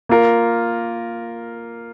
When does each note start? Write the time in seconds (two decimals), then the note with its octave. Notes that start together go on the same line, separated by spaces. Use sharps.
0.09 A#3 F4 A#4